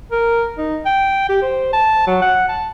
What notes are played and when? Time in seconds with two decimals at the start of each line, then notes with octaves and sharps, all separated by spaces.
0.12 A#4
0.58 D#4
0.85 G5
1.29 G4
1.42 C5
1.73 A5
2.07 F#3
2.22 F#5
2.48 A5